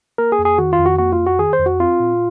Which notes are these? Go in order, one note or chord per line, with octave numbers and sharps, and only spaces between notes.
A#3 A#4
G#4
F2
G#4
D#3 F#4
F4
F2
F#4
A#3 F#4
F4
F2
F#4
D#3 G#4
C5
F2
F#4
C4 F4
A#2